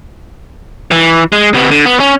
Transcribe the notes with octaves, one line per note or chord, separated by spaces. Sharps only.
E3
G#3
C3 B3
D3
B3
C#4